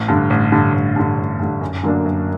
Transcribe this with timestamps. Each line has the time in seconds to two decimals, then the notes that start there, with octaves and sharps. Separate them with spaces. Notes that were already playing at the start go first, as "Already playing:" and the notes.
Already playing: A1
0.08 G2 D3
0.30 A1
0.52 G2 D3
0.74 A1
0.96 G2 D3
1.18 A1
1.39 G2 D3
1.61 F#2
1.83 D3 F#3 A#3 D4
2.06 F#2